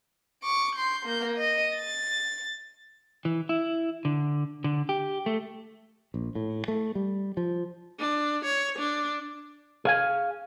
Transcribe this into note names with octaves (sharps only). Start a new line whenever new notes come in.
C#6 D6
C6 G6
A#3 G6
D#5
A6
E3
E4
D3
D3
G4
A3
A#1
A2
A3
G3
F3
D4
C#5
D4
G#4 F5 G#5